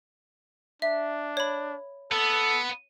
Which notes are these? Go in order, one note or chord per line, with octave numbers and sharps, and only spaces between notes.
D4 E5
C#5 B5
B3 A4